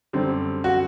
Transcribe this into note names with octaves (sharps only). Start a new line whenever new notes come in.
F#2 D3 G3 C4
F#4